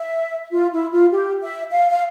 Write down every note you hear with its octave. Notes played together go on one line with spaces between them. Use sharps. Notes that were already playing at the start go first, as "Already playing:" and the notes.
Already playing: E5
F4
E4
F4
G4
E5
F5
F5